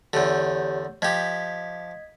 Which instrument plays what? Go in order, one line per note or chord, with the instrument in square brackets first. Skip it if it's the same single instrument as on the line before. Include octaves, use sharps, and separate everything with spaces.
[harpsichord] E2 D3 [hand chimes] G4 C#5 G6
[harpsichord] F3 G4 [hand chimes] D#5 G#6 B6